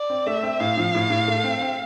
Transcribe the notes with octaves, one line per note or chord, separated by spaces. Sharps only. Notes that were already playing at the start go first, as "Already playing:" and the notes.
Already playing: D5
C4
A3 E5
C4
A2 F5
F3
A2
A2
A3
C4
C4